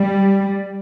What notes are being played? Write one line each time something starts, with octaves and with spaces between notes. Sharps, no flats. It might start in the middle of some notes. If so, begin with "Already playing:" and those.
Already playing: G3